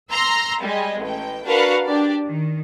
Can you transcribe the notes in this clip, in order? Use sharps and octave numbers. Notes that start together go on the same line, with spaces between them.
A#5 C6 E6
G3 G#3 D#5
A1 G5
D4 F#4 A#4 B4 F5 F#5
D4 G4 D5
D#3